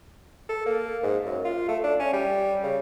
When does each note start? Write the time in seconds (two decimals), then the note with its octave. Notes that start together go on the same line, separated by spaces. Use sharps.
0.49 A4
0.66 A#3
1.03 G#2
1.25 F#2
1.45 F4
1.68 A3
1.84 D4
1.99 C#4
2.13 G3
2.63 C#3